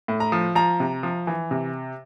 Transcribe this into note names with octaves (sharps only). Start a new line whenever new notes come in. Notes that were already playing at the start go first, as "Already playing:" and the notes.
A2
A#5
F3
F3 A#5
C3
F3
E3
C3